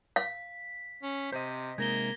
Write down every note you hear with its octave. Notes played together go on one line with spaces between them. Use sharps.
F5 B6
C#4
C3 C5 D#5
C3 G#3 A#3 D#4 G#6 A#6 G7